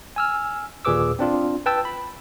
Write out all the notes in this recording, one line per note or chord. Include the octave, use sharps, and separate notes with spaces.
G#5 E6 F6
D#2 A#2 G#4 B4 D6 E6
C4 D4 F4
B4 G5 A5 E6
B5